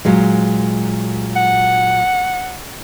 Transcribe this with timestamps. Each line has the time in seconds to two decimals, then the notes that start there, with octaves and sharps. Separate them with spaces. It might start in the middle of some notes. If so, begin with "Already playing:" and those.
0.05 A#2 F#3 G#3
1.36 F#5